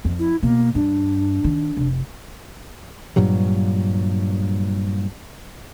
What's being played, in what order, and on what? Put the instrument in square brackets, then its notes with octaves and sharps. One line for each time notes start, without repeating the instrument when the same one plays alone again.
[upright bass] F2
[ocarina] E4
[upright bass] B2 [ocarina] A#3
[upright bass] G2 [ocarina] D4
[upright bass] D#3
F1
[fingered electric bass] G2 A#2 F#3 G3